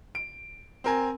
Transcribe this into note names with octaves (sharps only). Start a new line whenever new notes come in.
D7
C4 A#4 G#5